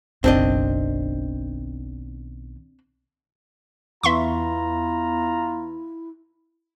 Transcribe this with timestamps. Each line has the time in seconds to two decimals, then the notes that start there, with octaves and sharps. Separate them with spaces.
0.24 F#1 B1 D#3 C4 D4 D#5
4.03 E2 B3 E4 F4 E5 A#5 C6 C#6